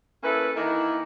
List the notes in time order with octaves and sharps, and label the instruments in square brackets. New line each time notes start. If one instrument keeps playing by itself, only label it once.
[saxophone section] A#3 C#4 E4 A4 B4
D#3 E3 A#3 D#4 E4